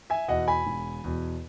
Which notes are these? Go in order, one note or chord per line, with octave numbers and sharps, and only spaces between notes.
E5 G#5
E2 B2 D#5 F#5
G#5 B5
E1
E2 B2